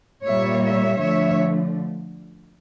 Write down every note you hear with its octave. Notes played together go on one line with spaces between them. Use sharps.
A#2 G3 A#3 C#5 E5
C#5 E5
D3 F3 A3 C#5 E5